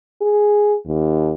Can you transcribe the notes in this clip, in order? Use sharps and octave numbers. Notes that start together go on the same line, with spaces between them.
G#4
D#2